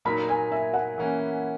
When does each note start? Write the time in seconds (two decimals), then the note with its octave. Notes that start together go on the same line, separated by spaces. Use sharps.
0.05 A#2 F#3 A#3 D#4 A#4 B5
0.29 G#5
0.52 E5
0.74 F#5
0.98 E3 A#3 C#4